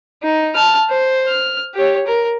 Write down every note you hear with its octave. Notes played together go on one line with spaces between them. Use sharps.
D#4
A5 F6
C5
F6
G4 C#5
A#4